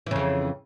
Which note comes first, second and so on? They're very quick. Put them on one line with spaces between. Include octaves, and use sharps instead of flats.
E3 C#3 F2